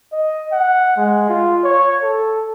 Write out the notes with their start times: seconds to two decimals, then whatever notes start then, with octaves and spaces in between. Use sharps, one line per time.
0.13 D#5
0.52 F#5
0.97 G#3
1.29 F4
1.64 C#5
2.03 A4